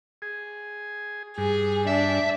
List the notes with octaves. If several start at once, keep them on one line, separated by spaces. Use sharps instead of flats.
G#4
G2 G#4
D4 E5